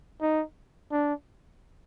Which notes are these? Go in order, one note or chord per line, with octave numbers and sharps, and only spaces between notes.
D#4
D4